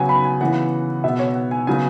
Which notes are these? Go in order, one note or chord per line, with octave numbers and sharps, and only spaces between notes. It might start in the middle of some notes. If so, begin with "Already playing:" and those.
Already playing: C#3 F#3 B3 F#5 G#5
B5
G#5
C#3 E3 B3 F#5
B2 B3 E5
C#5
F#5
G#5
C#3 F#3 B3 G#5